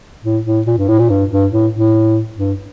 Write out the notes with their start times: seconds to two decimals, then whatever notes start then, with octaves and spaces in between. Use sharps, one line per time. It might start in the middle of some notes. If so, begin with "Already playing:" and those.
0.24 A2
0.46 A2
0.67 A#2
0.78 G2
0.88 A2
0.99 A#2
1.09 G2
1.31 G2
1.52 A2
1.74 A2
2.38 G2